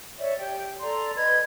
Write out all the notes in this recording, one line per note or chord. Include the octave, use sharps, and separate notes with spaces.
C#5 D5 E5
G4 G5
A4 D5 A#5 C6
B4 D#5 G#6